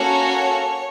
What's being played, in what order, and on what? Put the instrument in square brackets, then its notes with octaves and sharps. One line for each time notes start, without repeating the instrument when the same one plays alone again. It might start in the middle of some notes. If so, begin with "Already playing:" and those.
Already playing: [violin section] A#3 C#4 F#4 A4 C#5